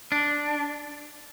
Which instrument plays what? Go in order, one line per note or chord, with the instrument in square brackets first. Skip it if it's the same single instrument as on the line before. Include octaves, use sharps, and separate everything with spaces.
[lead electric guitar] D4